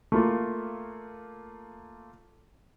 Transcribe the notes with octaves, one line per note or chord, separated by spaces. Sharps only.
A3 A#3 F4